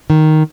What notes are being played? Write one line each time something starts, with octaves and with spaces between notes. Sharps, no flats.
D#3